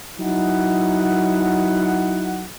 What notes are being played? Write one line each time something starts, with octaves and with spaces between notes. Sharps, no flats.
F#3 D#4 E4 F#5